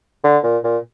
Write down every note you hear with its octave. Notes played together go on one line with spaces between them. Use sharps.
D3
A#2
A#2